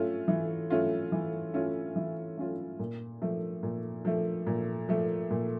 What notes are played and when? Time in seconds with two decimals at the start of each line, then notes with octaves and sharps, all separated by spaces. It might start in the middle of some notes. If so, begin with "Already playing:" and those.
Already playing: A3 C#4 F4
0.28 E3
0.70 A3 C#4 F4
1.12 E3
1.54 A3 C#4 F4
1.96 E3
2.37 A3 C#4 F4
2.79 A#2
3.22 F3 A3
3.63 A#2
4.05 F3 A3
4.47 A#2
4.89 F3 A3
5.30 A#2